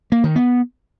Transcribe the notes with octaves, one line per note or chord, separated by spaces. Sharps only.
A#3
D#3
B3